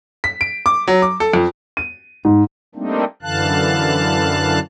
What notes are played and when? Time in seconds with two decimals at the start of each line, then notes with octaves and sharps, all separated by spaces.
0.24 B6
0.41 D7
0.66 D6
0.88 F#3
1.02 D6
1.20 A4
1.34 F2
1.77 D#7
2.25 G#2
2.75 G3 A3 A#3 C4 D4 D#4
3.22 F#2 D3 E3 F5 A5 F#6